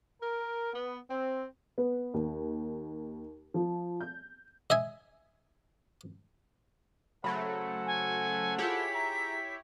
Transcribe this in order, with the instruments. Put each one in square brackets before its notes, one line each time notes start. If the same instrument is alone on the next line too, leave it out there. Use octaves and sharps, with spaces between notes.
[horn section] A#4
B3
C4
[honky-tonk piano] B3
D#2
F3
G6
[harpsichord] D#5 E5 G#5
[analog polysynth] C#3 F#3 A3 [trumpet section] A4 C5 F#5 [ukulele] B5
[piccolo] G#5
[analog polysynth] E4 G4 C#5 [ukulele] F4 G#4 [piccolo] B6
[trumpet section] E5 A#5